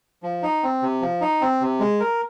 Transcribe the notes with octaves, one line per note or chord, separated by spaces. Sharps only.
F3
D#4
C4
C3
F3
D#4
C4
C3
G#3
A#4